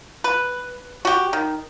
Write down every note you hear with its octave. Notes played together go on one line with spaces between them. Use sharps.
B4
F#4 G4
D#3